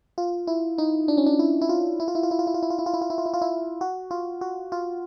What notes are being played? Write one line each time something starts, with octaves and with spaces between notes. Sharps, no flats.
F4
E4
D#4
D4
C#4
D4
E4
E4
F4
E4
F4
E4
F4
E4
F4
E4
F4
E4
F4
E4
F4
E4
F4
E4
F4
E4
F4
E4
F#4
F4
F#4
F4